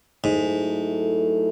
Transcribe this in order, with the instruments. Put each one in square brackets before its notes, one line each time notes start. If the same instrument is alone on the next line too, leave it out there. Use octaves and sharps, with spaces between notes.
[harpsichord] G#2 [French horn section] F#3 A3 E4 A4